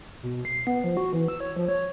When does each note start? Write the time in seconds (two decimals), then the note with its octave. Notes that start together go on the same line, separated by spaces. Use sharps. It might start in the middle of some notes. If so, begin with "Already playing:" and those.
0.23 B2
0.45 C7
0.67 B3
0.84 F3
0.97 F#4
1.13 E3
1.28 E6
1.40 C#5
1.56 F3
1.69 C#5